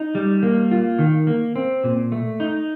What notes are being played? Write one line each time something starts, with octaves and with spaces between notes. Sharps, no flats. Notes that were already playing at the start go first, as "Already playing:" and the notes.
Already playing: D#4
G3
A#3
F4
D#3
A#3
C4
A#2
A3
D#4